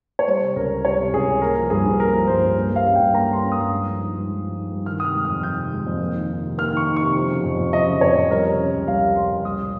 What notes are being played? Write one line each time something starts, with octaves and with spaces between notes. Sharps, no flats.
C#5
G3 C5
C3
C#2 A#4
C#2
G3 C#5
C3
C#2 G#4
C#2
A#3 A#4
F3
G2 G#4
G2
A#3 A#4
F3
G2 C5
G2
A#3
G3 F5
C#4
G2 G5
A#3 A#5
G3 C6
C#4
D#6
G2
G#3
F3
D#4
G2
G#3
F3
D#4
G2
D#3 F6
C3 D#6 F6
G#3
F2 F6
D#3 G6
C3
G#3
F2
A#3
D#3
D#4
C3
A#3 F6
D#3 C#6
D#4
C3 C#6
F3
C#3
F2
F2
F3 D#5
C#3
F2 C#5
F2
G3 A#4
C3
C#4
C#2
G3 F5
C3
C#4 C6
C#2
G3 D#6
A#2